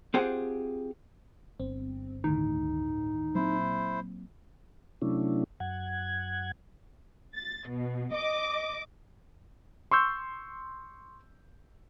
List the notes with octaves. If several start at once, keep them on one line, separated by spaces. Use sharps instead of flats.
C4 F4 G4 G#4 F#5
G1 C4
D2 A2 D#3 D#4
A#2 F#3 A#3 C4 E4 C5
C3 F#3 A3 C#4 D4 E4
F#2 F#5 G#6
A6
B2
D#5 D6
C6 C#6 E6 G6